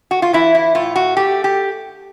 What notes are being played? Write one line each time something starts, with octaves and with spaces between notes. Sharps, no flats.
F#4
F4
E3 E4
E4
A2 F4
F#4
A3 G4
G4